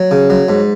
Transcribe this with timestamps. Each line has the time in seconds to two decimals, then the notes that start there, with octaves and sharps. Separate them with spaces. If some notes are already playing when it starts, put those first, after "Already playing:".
Already playing: F#3
0.11 C#3
0.30 F#3
0.49 G#2